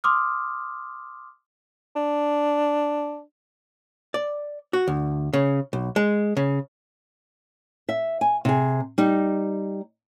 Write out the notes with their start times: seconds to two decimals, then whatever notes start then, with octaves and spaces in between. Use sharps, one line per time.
0.04 C6 D6 D#6 F6
1.96 D4
4.14 D5
4.73 F#4
4.88 D2
5.33 C#3
5.73 B1
5.96 G#3
6.37 C#3
7.89 E5
8.21 G#5
8.45 C3 G#4
8.98 G3 D#4